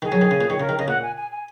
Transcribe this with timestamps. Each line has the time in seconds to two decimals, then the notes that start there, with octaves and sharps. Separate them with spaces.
0.02 D#3 G#4
0.12 F#3
0.21 D#3
0.31 C#3
0.41 A#2
0.49 D#3 C#5
0.60 C#3 A#4
0.69 D#3
0.78 C#3 D#5
0.88 A#2 F#5
1.02 G#5
1.16 G#5
1.31 G#5